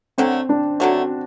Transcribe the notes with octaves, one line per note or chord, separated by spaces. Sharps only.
D3 F#3 A3 C4
D4
D3 F#3 A3 F#4